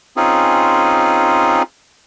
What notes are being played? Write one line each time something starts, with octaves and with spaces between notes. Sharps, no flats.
C4 C#4 D#4 F4 G#4